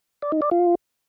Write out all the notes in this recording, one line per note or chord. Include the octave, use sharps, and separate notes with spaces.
D5
D#4
D5
F4